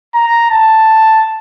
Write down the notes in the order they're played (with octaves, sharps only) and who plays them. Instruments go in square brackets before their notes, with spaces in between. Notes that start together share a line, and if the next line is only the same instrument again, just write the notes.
[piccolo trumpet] A#5
A5